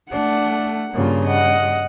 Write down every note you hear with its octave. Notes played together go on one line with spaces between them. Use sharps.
A3 D4 F#5
G2 C#3 A#3 F4
D#5 F#5